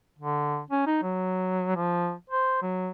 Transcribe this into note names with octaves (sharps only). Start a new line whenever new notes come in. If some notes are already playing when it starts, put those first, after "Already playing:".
D3
C#4
D#4
F#3
F3
C5
F#3